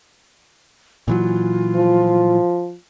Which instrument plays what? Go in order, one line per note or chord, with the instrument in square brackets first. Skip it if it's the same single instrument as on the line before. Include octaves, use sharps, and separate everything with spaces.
[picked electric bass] A#2 E3 F#3 [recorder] F4
[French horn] F3